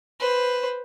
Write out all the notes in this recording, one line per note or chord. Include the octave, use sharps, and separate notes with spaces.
B4 C5